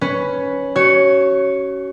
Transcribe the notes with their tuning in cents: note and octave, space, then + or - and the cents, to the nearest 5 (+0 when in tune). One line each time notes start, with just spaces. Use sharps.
C#4 +5 B4 +0
F#4 +35 C#5 +0